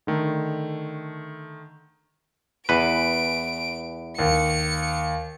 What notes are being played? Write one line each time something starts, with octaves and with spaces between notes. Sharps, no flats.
D3 D#3 A3
E2 B4 D7
D#2 C#7